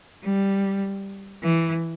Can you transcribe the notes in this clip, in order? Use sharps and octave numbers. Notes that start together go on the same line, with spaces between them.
G3
E3